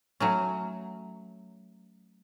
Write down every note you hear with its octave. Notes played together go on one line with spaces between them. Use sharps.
F#3 A3 C#4